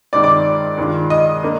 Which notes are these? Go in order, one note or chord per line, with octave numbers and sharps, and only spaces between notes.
G2 D#3 G#3 C4 D#4 D5 D6
D5 D6
G2 D#3 G#3 D4 F4
D#5 D#6
A#3 D4